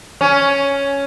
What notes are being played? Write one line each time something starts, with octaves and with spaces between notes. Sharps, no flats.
C#4